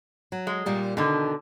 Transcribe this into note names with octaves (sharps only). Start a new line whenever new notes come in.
F#3
G#3
A#2 G3 A#3
B2 D3 D#3